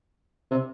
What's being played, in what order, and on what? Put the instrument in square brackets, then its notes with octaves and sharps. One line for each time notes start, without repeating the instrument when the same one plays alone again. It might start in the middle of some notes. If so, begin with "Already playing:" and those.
[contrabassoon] C3